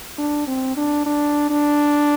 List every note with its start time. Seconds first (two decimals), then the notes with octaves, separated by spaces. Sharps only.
0.18 D4
0.47 C4
0.77 D4
1.06 D4
1.50 D4